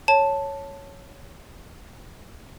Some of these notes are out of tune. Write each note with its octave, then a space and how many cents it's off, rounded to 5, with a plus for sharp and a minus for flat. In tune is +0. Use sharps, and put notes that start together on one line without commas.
C#5 +0 A5 +0